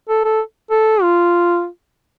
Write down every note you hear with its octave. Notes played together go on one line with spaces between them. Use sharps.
A4
A4
A4
F4